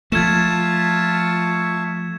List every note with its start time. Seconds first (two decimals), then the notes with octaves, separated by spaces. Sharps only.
0.12 F3 A3 F4 E5 A5 C#6 G#6 E7